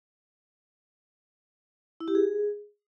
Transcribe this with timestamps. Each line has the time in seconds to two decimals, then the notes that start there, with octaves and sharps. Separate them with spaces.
2.00 E4
2.08 G4
2.15 G#4